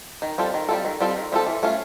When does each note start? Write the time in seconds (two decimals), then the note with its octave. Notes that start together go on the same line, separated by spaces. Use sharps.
0.22 D#3
0.38 G3 C4 F4 A4
0.54 D#3
0.69 G3 C4 F4 A4
0.85 D#3
1.01 G3 C4 F4 A4
1.17 D#3
1.32 G3 C4 F4 A4
1.47 E3
1.63 A3 C#4 F4